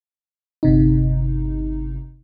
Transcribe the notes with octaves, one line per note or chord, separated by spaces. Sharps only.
G1 C3 D#4